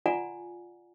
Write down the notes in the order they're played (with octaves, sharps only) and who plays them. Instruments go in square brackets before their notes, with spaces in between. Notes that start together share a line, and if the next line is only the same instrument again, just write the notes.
[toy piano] F4 D5 F#5 G#5 A#5